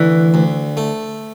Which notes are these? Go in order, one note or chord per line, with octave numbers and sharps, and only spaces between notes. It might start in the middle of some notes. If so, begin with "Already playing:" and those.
Already playing: D2 E3
D2
A3